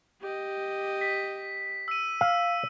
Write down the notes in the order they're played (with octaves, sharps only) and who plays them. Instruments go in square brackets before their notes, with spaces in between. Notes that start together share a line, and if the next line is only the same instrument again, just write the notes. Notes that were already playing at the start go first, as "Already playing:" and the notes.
[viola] G4 D#5
[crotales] B6
E6 D#7
[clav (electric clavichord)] F5 [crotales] E6